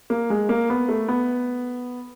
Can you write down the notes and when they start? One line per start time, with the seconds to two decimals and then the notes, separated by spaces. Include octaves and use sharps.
0.10 A#3
0.30 G#3
0.49 A#3
0.70 B3
0.89 A3
1.08 B3